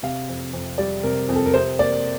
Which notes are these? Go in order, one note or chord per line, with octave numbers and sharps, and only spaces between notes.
C3 F5
F2
F2
G3 D5
C3 A#4
F2
A4
A#4
C3 C5
A#3 D5